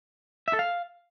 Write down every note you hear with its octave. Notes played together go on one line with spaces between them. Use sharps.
E5
A4
F5